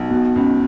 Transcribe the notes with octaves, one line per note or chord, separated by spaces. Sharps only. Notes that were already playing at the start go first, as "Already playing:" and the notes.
Already playing: B1
B2
C#2